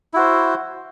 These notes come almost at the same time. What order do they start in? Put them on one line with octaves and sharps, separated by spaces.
E4 F#4 C5